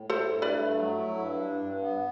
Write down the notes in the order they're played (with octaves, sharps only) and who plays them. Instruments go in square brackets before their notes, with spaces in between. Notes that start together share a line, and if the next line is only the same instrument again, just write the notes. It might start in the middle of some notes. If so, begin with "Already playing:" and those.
Already playing: [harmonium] A2
[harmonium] E4 [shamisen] A4 C5
[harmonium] G2
[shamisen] B4 D5
[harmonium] A3
F#3
E4
G2
D4
G2
B3